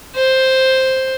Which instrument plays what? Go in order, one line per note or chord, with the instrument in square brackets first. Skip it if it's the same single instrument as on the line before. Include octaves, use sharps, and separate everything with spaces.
[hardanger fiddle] C5